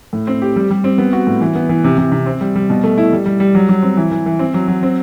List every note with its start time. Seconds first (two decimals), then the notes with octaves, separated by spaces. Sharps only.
0.13 A2
0.27 C4
0.42 G4
0.56 G3
0.70 G3
0.84 C4
0.98 B3
1.13 F#4
1.27 A2
1.41 E3
1.55 B3
1.69 E3
1.84 C3
1.98 C3
2.12 C3
2.26 C4
2.41 G3
2.55 G3
2.70 B2
2.84 A3
2.98 E4
3.12 G3
3.26 G3
3.40 G3
3.55 F#3
3.69 F#3
3.83 C4
3.97 E3
4.11 E3
4.26 E3
4.39 C4
4.54 F#3
4.68 F#3
4.83 C4